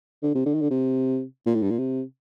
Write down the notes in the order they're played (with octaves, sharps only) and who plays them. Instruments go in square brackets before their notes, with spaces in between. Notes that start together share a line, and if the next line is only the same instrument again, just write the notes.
[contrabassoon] D3
C3
D3
D#3
D3
C3
A#2
A2
G2
A#2
C3